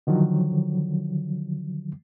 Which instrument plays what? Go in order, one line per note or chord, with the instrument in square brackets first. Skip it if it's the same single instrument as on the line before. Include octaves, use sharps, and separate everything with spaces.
[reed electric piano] D3 D#3 F3 F#3